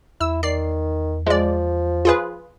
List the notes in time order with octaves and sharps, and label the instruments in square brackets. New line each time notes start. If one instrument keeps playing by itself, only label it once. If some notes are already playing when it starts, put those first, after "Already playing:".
[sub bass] E2 [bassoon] E4 [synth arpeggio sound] E6
[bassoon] D#3 [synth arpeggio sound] D5 C7
[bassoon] F3 [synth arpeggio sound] G#3 D5
[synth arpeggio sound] F4 G#4 B4